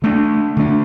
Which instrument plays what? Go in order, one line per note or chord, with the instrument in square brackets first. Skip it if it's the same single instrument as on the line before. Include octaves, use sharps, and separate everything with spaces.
[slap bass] D3 A3 D4
D3 A3 D4